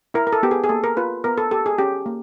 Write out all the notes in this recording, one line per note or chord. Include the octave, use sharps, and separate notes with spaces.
E4 A#4
A#4
A4
B3 G4
G#4
G#4
A#3 A4
A#4
F4 B4
B3 A#4
A4
G4 A4
G#4
C#4 G4
A#3